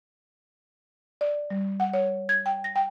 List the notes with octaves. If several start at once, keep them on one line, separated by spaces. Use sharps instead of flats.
D5
G3
F#5
C#5
G#6
G5
A#6
G5